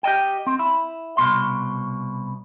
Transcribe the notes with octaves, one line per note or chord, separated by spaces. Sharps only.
G4 D#5 G5
C4
E4
C2 G2 B2 C6